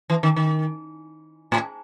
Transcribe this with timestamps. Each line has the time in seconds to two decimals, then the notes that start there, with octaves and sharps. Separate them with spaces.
0.10 E3
0.23 D#3
0.36 D#3
1.52 A2